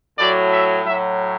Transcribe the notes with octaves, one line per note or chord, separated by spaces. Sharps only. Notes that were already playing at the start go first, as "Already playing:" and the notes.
A2 F#3 D5
E5
A2 F#3 E5